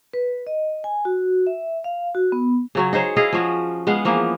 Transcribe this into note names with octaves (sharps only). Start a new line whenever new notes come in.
B4
D#5
G#5
F#4
E5
F5
F#4
B3
C#3 F#3 C#4
D#4 G#4 C5 C#5
E4 G#4 D#5 F5
F3 C#4 F#4
G#3 B3 F5 F#5
E3 F3 A#3 B3